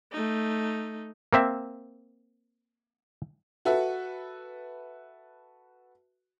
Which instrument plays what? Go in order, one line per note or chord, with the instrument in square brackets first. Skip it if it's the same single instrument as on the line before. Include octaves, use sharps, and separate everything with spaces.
[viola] A3 D#4
[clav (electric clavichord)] A#3 C4 E5
[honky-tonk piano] F#4 A4 B4 E5